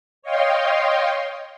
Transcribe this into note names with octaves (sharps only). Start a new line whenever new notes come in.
C#5 D#5 F5 G5 C6